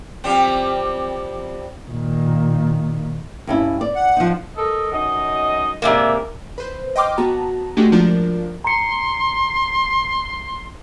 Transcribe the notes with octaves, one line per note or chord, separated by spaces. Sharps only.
F3 G3 C4
A#2 D#3
G2 C#4 E4
D5
F#5
F3 D#4
A4 A#4 D#5
F#2 D#4 D#5
G#2 C3 A#3 D5 E5
B4 C5
D#5 G5 C6 D6 F6
B3 F#4 A5 A#5
G#3 A3 D4 F#4 G4
F3 D4 F4 A#4
A#5 C6 C#7